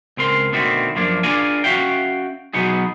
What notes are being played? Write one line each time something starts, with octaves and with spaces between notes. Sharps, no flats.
C#2 C4 A#4 C6
B2 D3 D#3 A3 C4
F#2 F3 A#3 D4
D4 F4 G#4 A#4 D5 G#5
C#4 F#4 E5 F5 G5
B2 F#3 B3 D#4 G#4